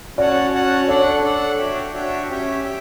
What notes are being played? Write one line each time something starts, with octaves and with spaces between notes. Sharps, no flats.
C#4 F#4 C#5 D5 F#5 A5
C#4 F#4 C#5 F#5 A5
D4 A4 C#5 D5 F#5
D4 A4 D5 F#5
D4 F#4 C#5 E5 G5
D4 F#4 C#5 E5 G5
C#4 G4 C#5 E5 G5
E5 G5